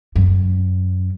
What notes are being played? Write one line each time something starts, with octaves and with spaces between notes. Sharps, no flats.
F#2